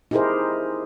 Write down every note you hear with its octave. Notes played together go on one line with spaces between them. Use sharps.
D#4 E4 G4 G#4 A#4 C5